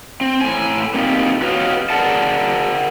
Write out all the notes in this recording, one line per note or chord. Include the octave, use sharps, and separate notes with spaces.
C4
A2 G#5
A#3 C4 D#4 F4 G4
F#4 G4 B4 C#5 D#5 F5
G#4 A#4 D5 F#5 A5